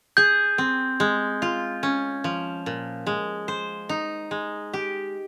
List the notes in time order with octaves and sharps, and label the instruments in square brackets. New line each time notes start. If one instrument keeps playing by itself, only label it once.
[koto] G#4 [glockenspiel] G6
[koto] C4
G#3
F4
C#4
F3
A#2
G#3
C5
D#4
G#3
G4